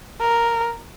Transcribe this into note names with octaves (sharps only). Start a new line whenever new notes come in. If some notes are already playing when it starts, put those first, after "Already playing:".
A#4